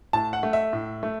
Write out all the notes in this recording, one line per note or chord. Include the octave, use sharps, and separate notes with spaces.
A2 A5
F#5
A3
E5
A2
A3